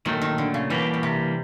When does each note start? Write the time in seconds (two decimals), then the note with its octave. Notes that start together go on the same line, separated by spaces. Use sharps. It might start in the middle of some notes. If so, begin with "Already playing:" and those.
0.05 A#2 D#3 F#3 A3
0.22 D#3
0.38 D3
0.54 C#3
0.70 B2 E3 G3 A#3 D4 G4
0.94 B2
1.03 C3